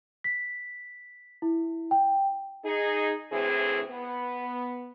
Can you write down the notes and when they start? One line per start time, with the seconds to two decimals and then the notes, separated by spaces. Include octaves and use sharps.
0.24 B6
1.42 E4
1.91 G5
2.65 D#4 G#4
3.31 D2 A2 E3 C4 G#4
3.90 B3